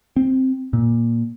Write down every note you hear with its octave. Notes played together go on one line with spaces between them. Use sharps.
C4
A#2